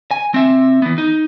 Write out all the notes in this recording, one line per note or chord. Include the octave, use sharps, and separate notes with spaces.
G#5
C4 E5
E3 B3
D#4